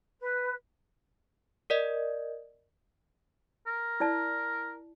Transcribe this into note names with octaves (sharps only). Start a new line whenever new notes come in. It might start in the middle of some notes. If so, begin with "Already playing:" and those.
B4
A#4 D5 D#5
A#4
E4 D5 A5